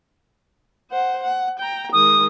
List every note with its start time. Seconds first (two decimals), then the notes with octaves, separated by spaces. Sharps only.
0.91 C5 F#5
1.23 F#5
1.59 G5 A#5
1.93 D#3 G#3 D#6